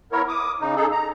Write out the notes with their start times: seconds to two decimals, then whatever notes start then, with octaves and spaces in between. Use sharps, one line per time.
0.12 B3 E4 A#4 C#5
0.28 D6 D#6
0.61 C#3 D#4
0.76 D#4 G#4 A4
0.92 A#5